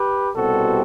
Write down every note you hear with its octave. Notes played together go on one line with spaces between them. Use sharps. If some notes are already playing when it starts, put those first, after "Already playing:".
Already playing: G4 B4
C2 B2 G3 C4 F#4 A4